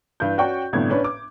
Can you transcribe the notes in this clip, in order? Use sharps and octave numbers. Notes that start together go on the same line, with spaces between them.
G2 E3 G6
C#4 F#4 D5 G5 C#6
G1 A2 C3 D4 G#6
C#4 D4 B4 C#5
D6